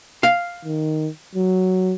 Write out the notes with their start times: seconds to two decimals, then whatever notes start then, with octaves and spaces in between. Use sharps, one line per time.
0.23 F5
0.65 D#3
1.35 F#3